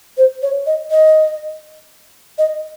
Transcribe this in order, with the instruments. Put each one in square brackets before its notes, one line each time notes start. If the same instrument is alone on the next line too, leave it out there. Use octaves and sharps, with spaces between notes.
[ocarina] C5
C#5
D#5
D#5
D#5